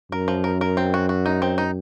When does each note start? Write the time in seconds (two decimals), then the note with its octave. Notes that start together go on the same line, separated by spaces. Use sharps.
0.12 F#2 A#4
0.28 F3
0.44 A#4
0.61 A#4
0.77 C4
0.94 F#4
1.09 F#4
1.26 D#4
1.42 C4
1.58 D#4